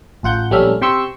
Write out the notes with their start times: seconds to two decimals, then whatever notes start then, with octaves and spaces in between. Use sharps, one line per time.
0.23 A1 F4 F#5 G6
0.51 A#1 G3 A3 C#4 E5 F6
0.81 C3 G5 C6 C#6 E6 C#7